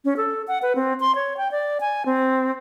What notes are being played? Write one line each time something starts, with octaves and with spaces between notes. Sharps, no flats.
C#4
A4
F#5
B4
C4
C6
C#5
G5
D5
G#5
C4